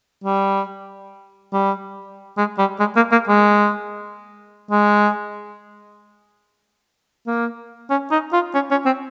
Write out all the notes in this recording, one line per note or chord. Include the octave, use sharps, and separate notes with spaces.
G3
G3
G#3
G3
G#3
A#3
A#3
G#3
G#3
A#3
C#4
D#4
F4
C#4
C#4
C4